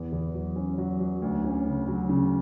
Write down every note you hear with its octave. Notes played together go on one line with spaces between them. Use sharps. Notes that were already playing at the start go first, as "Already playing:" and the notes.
Already playing: E2
E2
F#3
C#4
F#3
F#3
D2
C#4
C#3
F#3
C#3